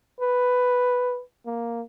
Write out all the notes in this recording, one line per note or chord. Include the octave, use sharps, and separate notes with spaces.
B4
A#3